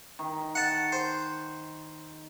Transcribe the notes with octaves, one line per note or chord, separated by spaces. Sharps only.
D#3
F#5 A5
C5